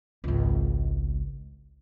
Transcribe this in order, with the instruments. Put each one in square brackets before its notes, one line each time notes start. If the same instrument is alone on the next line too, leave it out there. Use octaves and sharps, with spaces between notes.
[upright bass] G#1 C#2